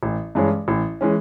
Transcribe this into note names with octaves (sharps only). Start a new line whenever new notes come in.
A1
G2 E3 G#3 C#4
A1
E3 G#3 C#4